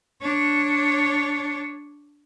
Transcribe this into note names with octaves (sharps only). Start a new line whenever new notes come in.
D4 C#5